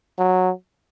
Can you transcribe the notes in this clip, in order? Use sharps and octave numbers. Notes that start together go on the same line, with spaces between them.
F#3